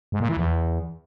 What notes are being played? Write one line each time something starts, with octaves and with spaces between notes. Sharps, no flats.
G#2
A#2
E3
E2